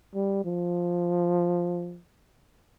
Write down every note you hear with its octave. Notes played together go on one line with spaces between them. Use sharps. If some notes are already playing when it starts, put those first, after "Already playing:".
G3
F3